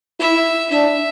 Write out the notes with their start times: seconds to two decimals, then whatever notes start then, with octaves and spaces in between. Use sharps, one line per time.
0.20 E4 E5
0.71 D4 E5